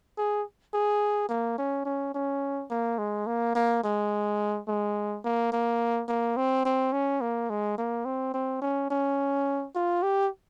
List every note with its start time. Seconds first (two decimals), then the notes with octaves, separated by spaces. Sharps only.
0.17 G#4
0.74 G#4
1.29 A#3
1.58 C#4
1.85 C#4
2.14 C#4
2.70 A#3
2.98 G#3
3.27 A#3
3.55 A#3
3.84 G#3
4.68 G#3
5.24 A#3
5.53 A#3
6.08 A#3
6.37 C4
6.65 C4
6.93 C#4
7.21 A#3
7.50 G#3
7.78 A#3
8.05 C4
8.34 C4
8.62 C#4
8.90 C#4
9.75 F4
10.03 G4